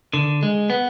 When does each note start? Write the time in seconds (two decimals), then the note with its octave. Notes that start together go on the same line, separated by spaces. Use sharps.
0.13 D3
0.43 G#3
0.70 B3